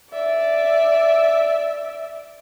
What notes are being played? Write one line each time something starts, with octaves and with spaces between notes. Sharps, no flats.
D5 E5